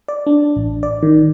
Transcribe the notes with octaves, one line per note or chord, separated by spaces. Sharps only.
D5
D4
A1
D5
D#3